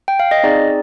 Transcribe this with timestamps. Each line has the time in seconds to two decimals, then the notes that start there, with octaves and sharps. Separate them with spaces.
0.08 G5
0.20 F5
0.31 D#5
0.43 C4 D#4 G#4 D5